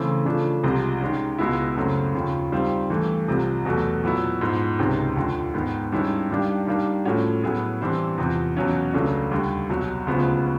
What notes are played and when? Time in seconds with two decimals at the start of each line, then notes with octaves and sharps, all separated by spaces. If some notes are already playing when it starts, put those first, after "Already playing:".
Already playing: C#3 E3 A3 C4 E4
0.25 C#3 F3 A3 D4
0.63 C2 C3 F3 G#3
1.01 D#3 G#3 C#4
1.38 C#2 B2 G#3 B3 E4
1.76 F#2 C#3 F#3 A3 C4
2.14 D#2 C#3 F3
2.52 D#3 G3 C4 F4
2.90 G2 E3 A3
3.28 C2 C3 F3
3.65 E2 B2 F#3 A3
4.04 A#2 F#3 B3 E4
4.41 G#2 F3 G#3 B3
4.79 C#2 C3 D#3 G#3 C#4
5.16 D#2 D3 F3
5.53 G#2 D#3 G#3 B3
5.92 G2 D#3 G#3 C#4 E4
6.30 G2 D#3 G3 A#3 D4
6.67 D#3 G3 A#3 D4
7.05 A2 F3 A3 C#4 F#4
7.43 A2 F#3 B3 E4 G#4
7.81 G2 E3 G3 C4 E4
8.18 E2 C3 F3
8.56 E2 B2 F#3 A#3 C#4
8.93 C#2 C#3 F#3 A3 D4
9.31 D#2 D3 G3
9.69 C2 B2 F#3
10.07 D2 C#3 F3 G#3 B3